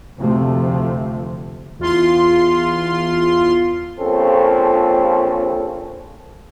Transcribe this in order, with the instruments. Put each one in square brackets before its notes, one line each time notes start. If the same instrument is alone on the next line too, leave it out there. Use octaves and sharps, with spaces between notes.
[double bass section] F1 D2 C3 F3 A3
[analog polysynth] E2 F4 C6
[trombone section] A#1 C4 C#4 A4